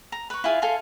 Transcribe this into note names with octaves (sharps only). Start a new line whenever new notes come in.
A#5
B4 C#6
E4 F4 G#4 F5
A4 F5 G#5 C6